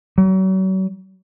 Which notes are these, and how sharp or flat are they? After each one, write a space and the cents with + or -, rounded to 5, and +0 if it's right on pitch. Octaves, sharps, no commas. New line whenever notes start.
F#3 +40